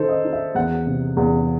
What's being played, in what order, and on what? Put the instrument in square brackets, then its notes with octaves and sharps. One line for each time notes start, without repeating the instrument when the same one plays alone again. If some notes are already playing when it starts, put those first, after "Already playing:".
Already playing: [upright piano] D#3 D#4 A4 C5
D#5
D#4
E5
E2 F#5
C3
E2